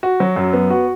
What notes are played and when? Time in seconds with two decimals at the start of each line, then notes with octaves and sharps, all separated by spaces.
0.03 F#4
0.20 F#3
0.36 F#2
0.53 B3
0.70 F#4